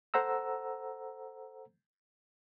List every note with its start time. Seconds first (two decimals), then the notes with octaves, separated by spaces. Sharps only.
0.14 A4 C5 F#5 A#5 E6